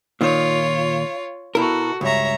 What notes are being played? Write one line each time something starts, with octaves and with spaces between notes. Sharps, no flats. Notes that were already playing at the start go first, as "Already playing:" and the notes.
A#2 D#3 F4 C#5
B2 E4 F#4 A4 A#4
C#2 G2 C#5 E5 A#5